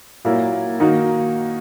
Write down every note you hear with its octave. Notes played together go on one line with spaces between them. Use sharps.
A#2 F#3 A#3 E4
D#3 A#3 D#4 F#4